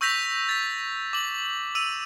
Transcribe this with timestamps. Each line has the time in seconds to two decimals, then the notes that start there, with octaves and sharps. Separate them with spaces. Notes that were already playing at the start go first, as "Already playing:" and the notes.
0.01 C#6 E6 G6 A#6 B6 F7
0.49 A6 B6
1.13 D6 F#7
1.75 E6 D#7 F7